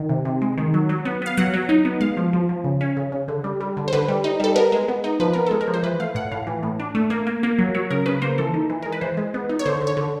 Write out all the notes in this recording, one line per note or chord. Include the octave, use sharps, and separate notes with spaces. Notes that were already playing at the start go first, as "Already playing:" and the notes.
Already playing: D#3
C3
C3
G#3
D#3
F#3
F#3
B3
B3 F5
F#3 F#5
F#3
D#4
B3
G#3 F5
F3
F3
F3
C#3
C#4
C#3
C#3
D3
G3
G3
D3
C5
D3 B4
G3
D#4
G3 A4
B3 A#4
G#3
B3
D#4
F3 B4
B3 A#4
G#3 A4
A#4
F3
C5
E3 B4
A3 F5
A2 F#5
A2 F5
E3
A2
D4
A3
A#3
A#3
A#3
F#3
F#3 C#5
C#3 A#4
C#3 B4
A#3 C5
E3 A4
D#4
E3
G#3 A#4
B4
E3 C5
G#3
B3
D#4
C#5
D3 C5
D3
C#5
D3